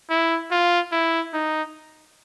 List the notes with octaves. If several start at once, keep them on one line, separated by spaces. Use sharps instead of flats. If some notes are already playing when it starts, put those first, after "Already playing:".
E4
F4
E4
D#4